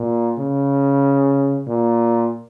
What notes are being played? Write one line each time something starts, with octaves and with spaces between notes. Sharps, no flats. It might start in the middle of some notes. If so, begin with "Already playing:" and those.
Already playing: A#2
C#3
A#2